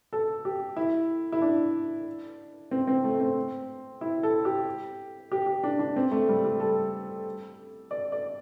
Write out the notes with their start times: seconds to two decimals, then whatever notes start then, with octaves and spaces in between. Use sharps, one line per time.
0.13 A4
0.45 G4
0.76 E4
1.32 E4
1.41 D4
2.71 C4
2.87 C4
3.04 A3
3.20 C4
4.01 E4
4.23 A4
4.45 G4
5.32 G4
5.47 G4
5.63 D4
5.79 D4
5.96 C4
6.11 A3
6.29 G3
6.44 G3
6.60 A4
7.91 D5
8.12 D5